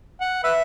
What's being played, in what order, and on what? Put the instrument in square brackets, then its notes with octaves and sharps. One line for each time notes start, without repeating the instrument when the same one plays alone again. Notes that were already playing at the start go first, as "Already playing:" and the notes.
[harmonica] F#5
B4 E5